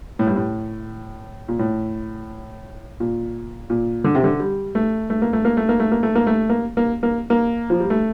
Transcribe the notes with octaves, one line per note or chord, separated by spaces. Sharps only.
A2
G2
A2
A#2
A2
A#2
A#2
D3
C3
D3
G3
A3
A3
A#3
A3
A#3
A3
A#3
A3
A#3
A3
A#3
A3
A#3
A#3
A#3
A#3
F3
G3
A3